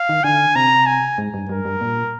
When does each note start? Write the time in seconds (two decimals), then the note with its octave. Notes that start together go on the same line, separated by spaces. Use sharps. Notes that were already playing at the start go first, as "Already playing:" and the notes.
Already playing: F5
0.09 D#3
0.24 D3 G#5
0.55 C3 A#5
0.87 G#5
1.18 G#2
1.34 G2
1.49 G2 A#4
1.65 G2
1.81 A#2